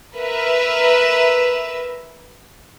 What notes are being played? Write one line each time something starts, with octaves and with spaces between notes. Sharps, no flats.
A#4 B4 E5